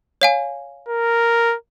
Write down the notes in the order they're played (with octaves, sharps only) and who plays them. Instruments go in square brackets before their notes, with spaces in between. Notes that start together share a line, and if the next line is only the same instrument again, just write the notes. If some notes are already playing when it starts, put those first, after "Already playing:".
[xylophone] C#5 F5 G#5
[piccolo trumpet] A#4